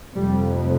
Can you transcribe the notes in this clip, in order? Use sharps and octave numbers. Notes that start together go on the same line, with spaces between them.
F1 F2 C3 G3